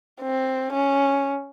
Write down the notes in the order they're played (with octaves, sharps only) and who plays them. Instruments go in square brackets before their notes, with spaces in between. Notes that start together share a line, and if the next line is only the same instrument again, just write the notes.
[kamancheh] C4
C#4